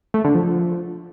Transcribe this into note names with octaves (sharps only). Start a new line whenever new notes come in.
A3
D3
F3